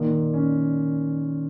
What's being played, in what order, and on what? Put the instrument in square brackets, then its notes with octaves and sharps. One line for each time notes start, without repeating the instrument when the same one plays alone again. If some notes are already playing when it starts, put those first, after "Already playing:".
Already playing: [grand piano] A#2 [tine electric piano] D#3
[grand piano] C#4